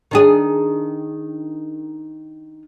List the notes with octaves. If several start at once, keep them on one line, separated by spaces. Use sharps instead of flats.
D#3 D4 G#4